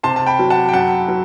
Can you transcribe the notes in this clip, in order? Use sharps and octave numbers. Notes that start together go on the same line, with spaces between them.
C3 A5 C6
A5
G5 B5
F#3
F#5 A5
G5
F#2 F#5 A5
F#3